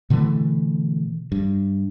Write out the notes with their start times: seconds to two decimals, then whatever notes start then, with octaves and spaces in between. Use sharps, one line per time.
0.10 B2 D3 E3 A3
1.32 G2